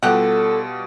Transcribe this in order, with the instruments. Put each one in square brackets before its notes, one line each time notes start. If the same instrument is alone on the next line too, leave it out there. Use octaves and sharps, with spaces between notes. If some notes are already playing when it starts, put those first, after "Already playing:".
[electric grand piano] B2 G3 F4 [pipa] G4 F#5 [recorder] A4